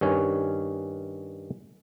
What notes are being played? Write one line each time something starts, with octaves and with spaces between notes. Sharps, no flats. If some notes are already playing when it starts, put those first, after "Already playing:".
G2 D#3 C#4 G#5